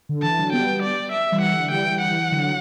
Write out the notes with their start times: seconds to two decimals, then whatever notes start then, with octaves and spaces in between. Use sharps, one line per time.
0.09 D3
0.23 E3 A5
0.39 D3 F#3
0.53 G3 B3 G5
0.83 D5
1.12 E5
1.32 E3 G3
1.42 F#5
1.53 D3
1.71 E3 G3 G5
1.91 E3 G3
2.01 F#5
2.11 E3
2.31 D3 F#3
2.43 F#3